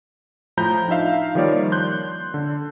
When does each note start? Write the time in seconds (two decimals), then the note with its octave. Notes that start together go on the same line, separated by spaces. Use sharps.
0.57 A2 F3 A#5 B5 G6
0.88 D4 D#4 F4 E5 F5
1.35 D#3 F3 G3 A#3 C#5 D5
1.72 C6 F#6 G6
2.34 D3